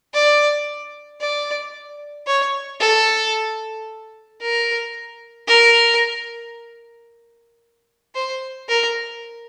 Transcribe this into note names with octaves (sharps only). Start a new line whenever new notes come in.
D5
D5
C#5
A4
A#4
A#4
C5
A#4